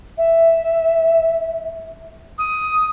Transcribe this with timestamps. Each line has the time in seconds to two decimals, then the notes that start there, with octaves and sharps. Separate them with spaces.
0.18 E5
2.38 D#6